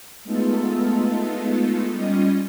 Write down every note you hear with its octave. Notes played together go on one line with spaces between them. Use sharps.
G#3 A3 B3 D#4 F4 A4
G3 C#4 F4 D#5